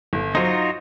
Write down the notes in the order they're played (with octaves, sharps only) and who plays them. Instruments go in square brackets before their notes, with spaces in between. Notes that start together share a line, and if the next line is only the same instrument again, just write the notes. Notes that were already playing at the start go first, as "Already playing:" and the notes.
[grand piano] G1
[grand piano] F#3 C5 [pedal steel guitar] D#4 F4 F#4